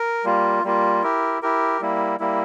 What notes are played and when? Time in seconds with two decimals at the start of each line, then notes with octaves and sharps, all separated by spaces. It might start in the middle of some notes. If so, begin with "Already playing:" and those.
Already playing: A#4
0.24 G3 A#3 F4
0.64 G3 A#3 F4
1.03 E4 G4 A#4
1.42 E4 G4 A#4
1.81 G3 A#3 E4
2.20 G3 A#3 E4